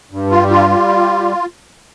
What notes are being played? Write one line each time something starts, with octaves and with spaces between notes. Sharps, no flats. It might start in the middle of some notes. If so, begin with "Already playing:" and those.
G2
F4
G3
F4
G3